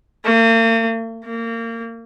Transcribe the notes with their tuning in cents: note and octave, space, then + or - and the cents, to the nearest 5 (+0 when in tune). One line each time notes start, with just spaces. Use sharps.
A#3 -45
A#3 -25